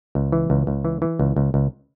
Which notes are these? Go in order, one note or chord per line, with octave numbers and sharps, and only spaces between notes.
C#2
E3
C#2
C#2
E3
E3
C#2
C#2
C#2